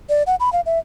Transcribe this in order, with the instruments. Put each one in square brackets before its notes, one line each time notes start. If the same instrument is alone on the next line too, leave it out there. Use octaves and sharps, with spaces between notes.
[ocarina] D5
F#5
B5
F5
E5